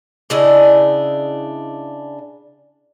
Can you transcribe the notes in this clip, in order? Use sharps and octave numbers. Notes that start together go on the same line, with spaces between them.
C#3 D4 E4 D#5